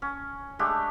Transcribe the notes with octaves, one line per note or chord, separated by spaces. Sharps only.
C#4
G#3 A3 D4 G4